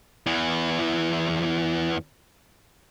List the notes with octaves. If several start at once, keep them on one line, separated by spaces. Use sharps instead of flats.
E2 E3